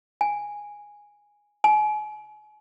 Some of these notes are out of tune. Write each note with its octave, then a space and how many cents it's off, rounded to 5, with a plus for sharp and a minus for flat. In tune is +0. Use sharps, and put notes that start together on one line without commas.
G#5 -5
G#5 +35